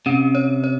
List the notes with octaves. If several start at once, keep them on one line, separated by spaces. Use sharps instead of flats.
C3 C#4
C#5
C#5